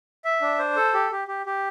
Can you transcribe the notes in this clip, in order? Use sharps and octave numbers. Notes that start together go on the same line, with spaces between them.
E5
D4
C5
A4
G4
G4
G4
G4